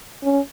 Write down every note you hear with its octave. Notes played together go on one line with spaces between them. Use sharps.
C#4